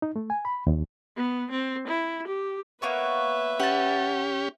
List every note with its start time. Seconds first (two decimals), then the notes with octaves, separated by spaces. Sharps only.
0.02 D#4
0.16 A3
0.30 G#5
0.45 B5
0.67 D#2
1.17 B3
1.51 C4
1.88 E4
2.28 G4
2.82 A#3 B3 B4 C#5 E5
3.60 C#4 G4 F#5 A5